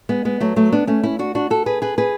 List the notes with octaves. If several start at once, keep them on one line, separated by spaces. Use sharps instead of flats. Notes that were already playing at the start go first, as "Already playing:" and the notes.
G#3 B3
G#3 B3
F#3 A3
F#3 A3
B3 D4
A3 C#4
C#4 E4
D4 F#4
D4 F#4
F#4 A4
G#4 B4
G#4 B4
G#4 B4